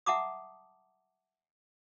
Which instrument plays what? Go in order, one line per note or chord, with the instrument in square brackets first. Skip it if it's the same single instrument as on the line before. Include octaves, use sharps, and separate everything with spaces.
[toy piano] E5 F#5 A5 A#5 D6 D#6